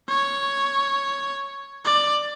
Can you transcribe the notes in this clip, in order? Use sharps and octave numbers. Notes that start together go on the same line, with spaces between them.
C#5
D5